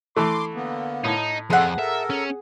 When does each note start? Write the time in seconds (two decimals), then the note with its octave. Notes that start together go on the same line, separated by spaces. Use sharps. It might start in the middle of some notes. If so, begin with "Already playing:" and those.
0.16 E3 A3 C6 D6
0.54 D3 A#3 B3
1.05 A2 D#4
1.50 F2 G#4 A4 F#5 C6
1.79 A4 A#4 E5
2.10 C#4